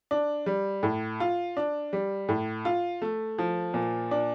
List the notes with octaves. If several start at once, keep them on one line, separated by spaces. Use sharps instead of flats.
D4
G3
A2
F4
D4
G3
A2
F4
A3
F3
A#2
D4